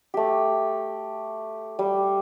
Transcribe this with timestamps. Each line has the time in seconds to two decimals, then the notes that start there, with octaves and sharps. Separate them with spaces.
0.14 A3 G4
1.79 G3